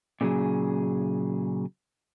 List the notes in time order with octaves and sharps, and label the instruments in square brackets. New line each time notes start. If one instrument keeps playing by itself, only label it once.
[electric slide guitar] A#2 C#3 F#3 G#4